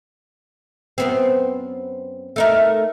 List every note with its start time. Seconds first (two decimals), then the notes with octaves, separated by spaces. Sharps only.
0.98 F#2 B3 C4
2.36 A3 D#4 A#4